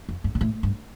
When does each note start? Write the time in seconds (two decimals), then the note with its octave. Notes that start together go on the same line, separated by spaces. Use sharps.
0.09 F2
0.24 G2
0.35 B2
0.41 A2
0.63 G2